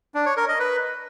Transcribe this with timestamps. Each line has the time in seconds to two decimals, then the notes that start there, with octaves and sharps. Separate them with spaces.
0.15 D4
0.26 C#5
0.37 A#4
0.48 D#5
0.59 B4